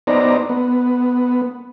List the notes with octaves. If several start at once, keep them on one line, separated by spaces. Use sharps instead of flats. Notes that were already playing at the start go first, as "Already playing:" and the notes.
B3 D#4 C5 D5 A#5
B3